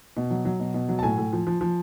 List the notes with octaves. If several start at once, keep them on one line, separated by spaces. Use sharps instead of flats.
B2
F#3
F#3
B2
B2
F#3
A5
A2 G#5
A2
F3
F3
F3